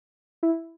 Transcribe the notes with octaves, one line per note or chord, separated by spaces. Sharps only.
E4